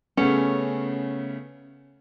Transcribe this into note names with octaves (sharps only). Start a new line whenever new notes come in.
C#3 A3 B3 C#4